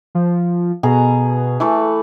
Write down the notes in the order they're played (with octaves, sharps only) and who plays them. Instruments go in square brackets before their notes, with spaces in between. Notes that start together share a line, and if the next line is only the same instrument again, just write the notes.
[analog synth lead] F3
[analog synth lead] B2 [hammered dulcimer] G#4 A#5
[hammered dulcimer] E3 A3 B4